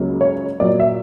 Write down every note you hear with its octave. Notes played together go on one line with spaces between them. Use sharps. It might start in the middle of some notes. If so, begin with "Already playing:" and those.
Already playing: C#2 C#3 F#3 A#3
C#5
A#2 F#3 A#3 D5
E5